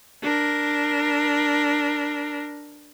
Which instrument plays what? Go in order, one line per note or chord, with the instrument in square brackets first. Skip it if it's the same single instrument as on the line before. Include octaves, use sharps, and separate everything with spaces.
[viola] D4 A#4